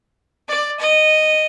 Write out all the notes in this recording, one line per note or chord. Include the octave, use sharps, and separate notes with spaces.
D5
D#5